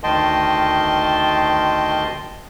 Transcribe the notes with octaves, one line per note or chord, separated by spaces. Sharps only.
D2 D#3 D#5 G5 A5 C6